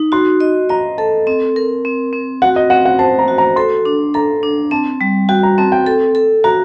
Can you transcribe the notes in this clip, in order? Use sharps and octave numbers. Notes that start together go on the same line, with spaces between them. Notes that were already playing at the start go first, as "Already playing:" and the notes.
Already playing: D#4
F#4 C6
D#5
D#5 A#5
A4 A5
C4
A#4
C4
C4
F#4 F#5
D#5
C4 F#5
F#5
C5 A5
A#5
F#4
A#5
A4 C6
D4
A4 A#5
D4
C4 A5
G3
F#4 G5
A#5
C4 A5
G5
A4
A4
F#4 A#5